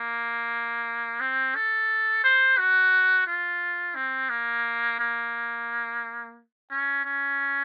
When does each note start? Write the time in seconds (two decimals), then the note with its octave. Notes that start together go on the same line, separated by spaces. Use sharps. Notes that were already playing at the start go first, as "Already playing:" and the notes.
Already playing: A#3
1.21 C4
1.55 A4
2.24 C5
2.58 F#4
3.27 F4
3.95 C4
4.30 A#3
4.99 A#3
6.71 C#4
7.05 C#4